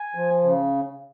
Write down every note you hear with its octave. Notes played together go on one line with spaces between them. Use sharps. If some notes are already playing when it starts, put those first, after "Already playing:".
Already playing: G#5
F3
C#3